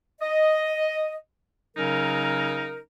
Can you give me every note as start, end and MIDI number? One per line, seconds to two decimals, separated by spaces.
0.21 1.17 75
1.76 2.79 49
1.76 2.79 54
1.76 2.79 61
1.76 2.79 63
1.76 2.79 70